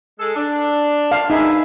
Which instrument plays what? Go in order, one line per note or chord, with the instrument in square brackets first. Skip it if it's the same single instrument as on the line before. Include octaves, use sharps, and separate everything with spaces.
[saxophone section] G#3 A4
D4
[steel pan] F5
[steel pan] D#4 [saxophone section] G#4 B4 E5